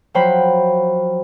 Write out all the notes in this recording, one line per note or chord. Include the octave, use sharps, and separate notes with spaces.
F3 F#3 C5 G5 B5